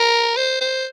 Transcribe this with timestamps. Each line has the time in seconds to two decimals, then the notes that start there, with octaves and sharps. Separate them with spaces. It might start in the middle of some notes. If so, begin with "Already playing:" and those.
Already playing: A#4
0.37 C5
0.61 C5